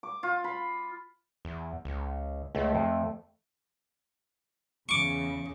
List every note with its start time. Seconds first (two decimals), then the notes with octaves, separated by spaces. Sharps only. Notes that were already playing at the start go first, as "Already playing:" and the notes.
0.03 D6
0.23 F4
0.44 B5
1.45 E2
1.85 C#2
2.55 C#2 A3
2.75 F2
4.89 E2 C#3 C#6 D6